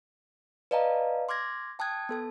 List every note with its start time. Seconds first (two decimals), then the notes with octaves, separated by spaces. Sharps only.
0.71 B4 D5 D#5 F5 A5 A#5
1.29 C6 D6 F6 G#6 A#6
1.79 G5 A5 D#6 F#6 G#6
2.09 B3 A4 A5